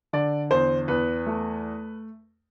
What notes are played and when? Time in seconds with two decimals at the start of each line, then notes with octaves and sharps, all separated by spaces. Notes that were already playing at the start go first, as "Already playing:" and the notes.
0.13 D3 D5
0.50 E2 C5
0.88 E2 B4
1.26 A3